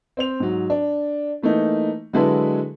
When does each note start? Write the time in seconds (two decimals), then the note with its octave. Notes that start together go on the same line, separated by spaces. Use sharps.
0.17 C4 C5 F7
0.40 G#2 F#3
0.70 D4
1.42 E3 A3 A#3 D#4
2.13 D3 F#3 G#3 E4 A4 B4